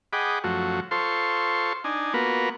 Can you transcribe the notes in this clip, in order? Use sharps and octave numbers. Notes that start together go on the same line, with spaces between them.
G#4 D#5 F#5 G5 B5 D6
F#2 F3 A3 F#4
F4 A4 C5 C6 C#6
D4 D#4 G#5
A#3 B3 F4 F#4 A#4 B4